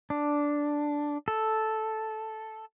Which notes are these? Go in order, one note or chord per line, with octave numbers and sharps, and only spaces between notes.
D4
A4